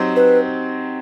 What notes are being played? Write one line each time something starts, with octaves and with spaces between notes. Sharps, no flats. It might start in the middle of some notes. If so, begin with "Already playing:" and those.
Already playing: F#3 C4 D#4 G4 C5
B4